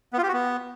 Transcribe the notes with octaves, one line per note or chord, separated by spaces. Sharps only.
B3
F4
G4
F#4
B3